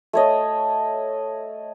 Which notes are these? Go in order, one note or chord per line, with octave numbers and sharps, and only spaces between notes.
A3 C#5 D#5